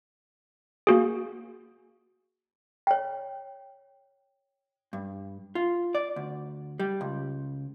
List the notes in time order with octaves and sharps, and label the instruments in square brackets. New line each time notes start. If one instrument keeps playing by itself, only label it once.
[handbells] A#3 F#4 G#4
[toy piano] C#5 G5
[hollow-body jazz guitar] G2
F4
D5
D2
G3
C#2